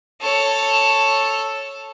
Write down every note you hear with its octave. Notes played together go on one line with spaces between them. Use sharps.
A4 C#5